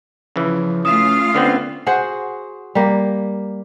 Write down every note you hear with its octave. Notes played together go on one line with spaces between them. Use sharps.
C#3 E3 F3
A3 C#4 F4 F5 D#6 E7
D3 B3 C4
F#4 G#4 C5 F#5
G3 A#3